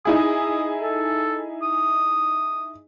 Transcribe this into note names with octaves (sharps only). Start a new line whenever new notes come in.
D#4 E4 G#4 D#6
A4
D#6